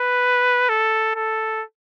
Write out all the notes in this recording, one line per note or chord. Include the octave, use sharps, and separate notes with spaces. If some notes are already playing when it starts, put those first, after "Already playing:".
Already playing: B4
A4
A4